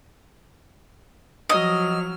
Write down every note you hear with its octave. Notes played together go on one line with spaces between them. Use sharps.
F3 F#3 D#5 F6